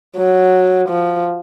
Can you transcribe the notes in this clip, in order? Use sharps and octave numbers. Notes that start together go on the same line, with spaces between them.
F#3
F3